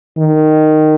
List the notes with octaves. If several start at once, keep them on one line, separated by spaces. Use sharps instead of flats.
D#3